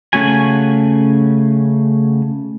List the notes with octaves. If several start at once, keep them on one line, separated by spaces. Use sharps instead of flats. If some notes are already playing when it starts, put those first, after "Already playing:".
C#3 A3 C#4 F#4 G#5